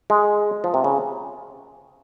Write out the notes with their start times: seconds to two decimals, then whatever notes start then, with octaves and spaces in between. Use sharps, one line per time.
0.10 G#3
0.64 F3
0.74 C3
0.84 C#3